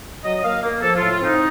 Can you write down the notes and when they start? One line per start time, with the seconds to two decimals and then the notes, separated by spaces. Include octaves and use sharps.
0.24 F#3 D#5
0.39 D#5
0.44 A#3 F5
0.63 A#3
0.82 F3 A4
0.96 A2 F4
1.11 F4
1.21 C4 D#4